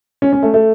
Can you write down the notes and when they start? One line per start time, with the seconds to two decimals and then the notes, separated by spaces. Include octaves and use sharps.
0.22 C#4
0.33 C#4
0.43 A3
0.54 A3